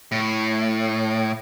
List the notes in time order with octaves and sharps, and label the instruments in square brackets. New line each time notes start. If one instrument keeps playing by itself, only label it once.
[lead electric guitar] A2